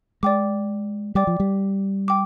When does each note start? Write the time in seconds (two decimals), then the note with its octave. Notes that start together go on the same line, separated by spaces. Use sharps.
0.23 G#3 D5 G5 D6
1.15 G3 D5 G5 D6
1.27 F3
1.40 G3
2.08 G5 D6